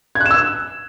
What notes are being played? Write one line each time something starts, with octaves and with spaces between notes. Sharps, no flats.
G#6
F#6
E7
E6